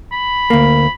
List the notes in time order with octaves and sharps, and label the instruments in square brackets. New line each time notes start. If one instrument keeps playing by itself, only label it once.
[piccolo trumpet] B5
[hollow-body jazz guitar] D2 A#3